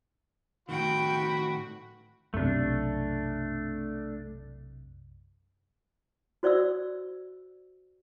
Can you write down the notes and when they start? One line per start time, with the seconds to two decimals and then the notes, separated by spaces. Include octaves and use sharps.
0.69 A2 D#3 F#4 G5 B5
2.34 B1 F#2 C3 A3 D4
6.43 F#4 C5 D5 E5 E6